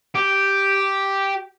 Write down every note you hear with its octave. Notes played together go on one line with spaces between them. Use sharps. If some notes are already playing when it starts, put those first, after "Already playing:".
G4